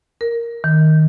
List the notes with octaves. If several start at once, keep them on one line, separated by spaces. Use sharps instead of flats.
A#4
D#3